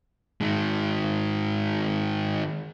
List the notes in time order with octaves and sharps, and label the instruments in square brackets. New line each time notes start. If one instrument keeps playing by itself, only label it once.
[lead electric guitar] D#3 G#3